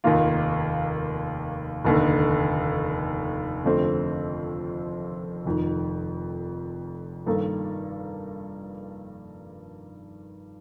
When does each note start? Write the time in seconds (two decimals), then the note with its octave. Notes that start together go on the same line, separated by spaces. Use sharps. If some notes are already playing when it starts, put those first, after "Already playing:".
0.04 F1 D#2 D#3 A#3 F4
1.85 F1 D#2 D3
3.65 F2 D3 A3 C4
5.46 F1 F2 D#3
7.26 G2 D#3 A#3 D#4 A4